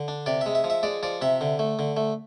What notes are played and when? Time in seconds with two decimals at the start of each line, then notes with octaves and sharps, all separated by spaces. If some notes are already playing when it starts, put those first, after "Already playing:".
Already playing: D3
0.08 D4
0.26 C3 D5
0.41 E5
0.46 G#3
0.55 E5
0.64 F3
0.70 E5
0.83 G#3 D5
1.03 F3 D5
1.21 C3 E5
1.41 D3
1.59 A3
1.79 D3
1.97 A3